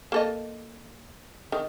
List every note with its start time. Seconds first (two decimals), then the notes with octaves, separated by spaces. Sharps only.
0.12 A#3 A4 D#5
1.52 D#3